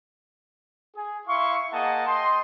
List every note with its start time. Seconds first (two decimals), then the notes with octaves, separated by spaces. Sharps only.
0.96 G#4
1.27 E4 F5 C6 C#6
1.73 A#3 G#4 D#5 F#5 A5
2.07 D#5 G5 C6